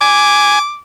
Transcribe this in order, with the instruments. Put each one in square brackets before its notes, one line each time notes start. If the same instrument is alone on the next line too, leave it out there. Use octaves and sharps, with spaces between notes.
[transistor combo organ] G#5 [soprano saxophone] D6